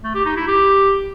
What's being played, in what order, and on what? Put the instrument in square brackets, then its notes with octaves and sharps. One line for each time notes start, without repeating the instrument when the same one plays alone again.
[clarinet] A3
G4
D#4
E4
G4